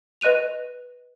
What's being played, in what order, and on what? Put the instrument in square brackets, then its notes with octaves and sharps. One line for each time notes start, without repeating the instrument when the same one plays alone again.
[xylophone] B4 D#5 F#6 D#7 F7